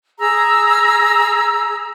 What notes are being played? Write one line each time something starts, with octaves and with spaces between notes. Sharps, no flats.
G#4 A#5 E6